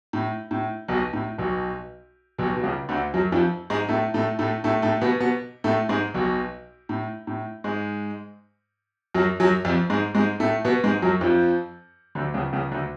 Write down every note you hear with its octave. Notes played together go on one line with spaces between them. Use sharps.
A2
A2
B1 B2
A2
B1 B2
B1 B2
B2
C#2 C#3
D2 D3
F#2 F#3
F2 F3
G#2 G#3
A2 A3
A2 A3
A2 A3
A2 A3
A2 A3
B2 B3
B2 B3
A2 A3
G#2 G#3
B1 B2
A2
A2
G#2 G#3
F#2 F#3
F#2 F#3
F2 F3
G#2 G#3
G#2 G#3
A2 A3
B2 B3
G#2 G#3
F#2 F#3
F2 F3
D2 D3
C#2 C#3
C#2 C#3
D2 D3